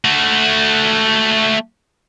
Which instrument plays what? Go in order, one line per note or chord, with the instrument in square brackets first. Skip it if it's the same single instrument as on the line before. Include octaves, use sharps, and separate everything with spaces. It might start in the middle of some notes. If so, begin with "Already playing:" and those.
[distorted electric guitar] A3 F#4